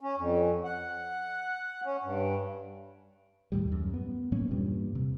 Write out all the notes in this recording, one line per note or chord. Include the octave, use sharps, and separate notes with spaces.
C#4
F2
F#5
C#4
G2
D#2 A2 G3
F#2
B3
A2 F#3 A#3 C#4
E2 G2 A#2 G3
C3